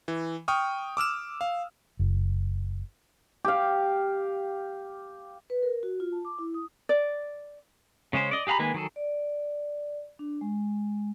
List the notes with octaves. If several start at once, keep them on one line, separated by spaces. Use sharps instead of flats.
E3
G5 C#6 D#6 F6
D6 E6 F6 E7
F5
F#1
G4 F5
B4
A#4
F#4
F4
A5
D6
E4
D#6
D5
C#3 G#3 C#4 C5
D5 D#5
G4 G#4 F#5 A#5 B5
D#3 G#3 A#3 B4 G#5
D#3 F#3 G#4 A4
D5
D4
G#3